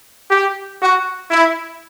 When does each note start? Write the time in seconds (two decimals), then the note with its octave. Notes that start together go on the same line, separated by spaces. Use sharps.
0.31 G4
0.81 F#4
1.31 E4